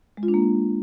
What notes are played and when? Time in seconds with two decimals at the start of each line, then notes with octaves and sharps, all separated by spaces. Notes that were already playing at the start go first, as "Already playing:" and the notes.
0.17 G#3
0.23 F4
0.28 D4
0.34 A#3